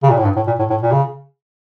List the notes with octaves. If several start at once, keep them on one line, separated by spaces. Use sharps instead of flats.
C#3
A#2
A2
G2
A2
A#2
A2
A2
A#2
C#3